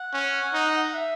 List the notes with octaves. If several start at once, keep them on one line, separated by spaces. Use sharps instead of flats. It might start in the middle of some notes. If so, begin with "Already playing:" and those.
Already playing: F#5
C#4
D#4
F#5
E5